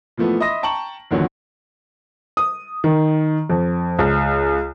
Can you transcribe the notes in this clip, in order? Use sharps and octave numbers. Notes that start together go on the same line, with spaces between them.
A#2 E3 F3 A3 B3
D#5 E5 B5 C6 D#6 A#6
G5 A5 A#5 C#6 F#7
E2 A#2 D3 D#3 F#3 C#4
D#6
D#3
F2
C#2